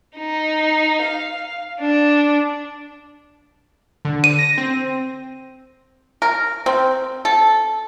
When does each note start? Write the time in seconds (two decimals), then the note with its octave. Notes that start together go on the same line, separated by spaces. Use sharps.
0.17 D#4
1.02 F5
1.80 D4
4.05 D3
4.24 D#7
4.39 A#6
4.58 C4
6.22 A#4
6.66 C4
7.25 A4